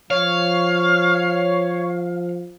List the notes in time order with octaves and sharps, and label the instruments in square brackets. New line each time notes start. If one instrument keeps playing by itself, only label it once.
[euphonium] F3 [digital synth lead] C#5 [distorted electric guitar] F5